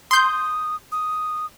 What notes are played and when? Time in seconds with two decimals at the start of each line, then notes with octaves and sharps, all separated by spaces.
0.11 C6 D#6 G6
0.92 D#6